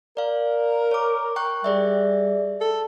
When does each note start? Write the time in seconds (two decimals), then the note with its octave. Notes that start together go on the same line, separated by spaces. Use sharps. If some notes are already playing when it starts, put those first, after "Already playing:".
0.17 A#4 D5 F5
0.91 C#5 D6
1.36 G5 C#6 F#6
1.64 G3 G#4 D5 E5
2.61 A4